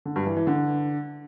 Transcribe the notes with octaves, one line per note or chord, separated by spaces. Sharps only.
D3
G2
E3
E3
D3